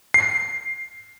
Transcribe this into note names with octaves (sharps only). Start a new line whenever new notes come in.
C7